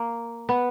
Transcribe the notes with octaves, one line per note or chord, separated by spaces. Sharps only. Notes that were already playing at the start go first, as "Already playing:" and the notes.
Already playing: A#3
B3